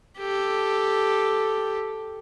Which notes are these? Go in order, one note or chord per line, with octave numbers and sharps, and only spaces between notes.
G4 A4